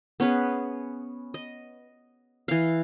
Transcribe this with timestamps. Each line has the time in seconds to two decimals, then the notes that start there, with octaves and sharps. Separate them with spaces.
0.20 B3 C#4 G#4 B4
1.34 D#5
2.48 E3 F5